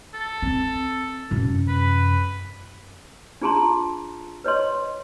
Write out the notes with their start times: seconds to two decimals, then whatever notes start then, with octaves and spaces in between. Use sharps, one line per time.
0.14 A4
0.42 C4
1.31 F#2 C3
1.68 B4
3.41 D4 F4 G#4 A5 A#5 C6
4.44 B4 C#5 D#5 C6